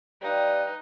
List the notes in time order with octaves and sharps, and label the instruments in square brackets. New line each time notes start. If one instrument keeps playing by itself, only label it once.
[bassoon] G3 [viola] D#4 [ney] B4 [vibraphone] D5 F5 G5